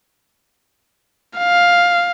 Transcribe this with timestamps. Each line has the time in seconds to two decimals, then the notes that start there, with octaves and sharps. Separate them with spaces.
1.38 F5